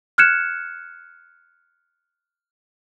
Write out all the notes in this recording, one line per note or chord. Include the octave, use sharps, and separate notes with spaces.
F6 F#6 G#6 C#7 E7